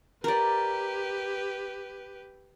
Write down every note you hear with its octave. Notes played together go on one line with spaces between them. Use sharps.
G4 A#4 B4 D5